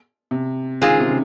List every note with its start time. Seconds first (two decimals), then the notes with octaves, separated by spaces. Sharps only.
0.31 C3
0.81 D#3 G#3 C4 F4 G#4
0.91 C#3
1.00 C3
1.09 C#3